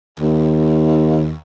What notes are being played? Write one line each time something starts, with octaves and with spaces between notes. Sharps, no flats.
D#2